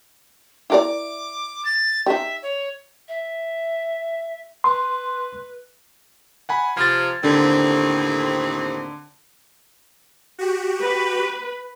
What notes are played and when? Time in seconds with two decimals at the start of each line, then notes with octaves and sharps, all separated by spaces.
0.70 E4 A#4 D5 D6
1.65 A6
2.06 D#4 G4 E5
2.43 C#5
3.08 E5
4.64 B4 C6
6.49 F#5 G#5 B5
6.77 C3 F3 G#6 A6
7.24 D#2 A2 D3 C4
10.39 F#4 G4
10.80 B4